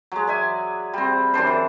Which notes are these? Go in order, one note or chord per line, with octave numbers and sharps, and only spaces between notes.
F#3 G#3
D5 E5 G#5
G3 C4
F#2 E3 D4 C5
E3